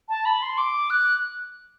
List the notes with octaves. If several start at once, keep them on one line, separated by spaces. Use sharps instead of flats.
A5
B5
C6
D6
F#6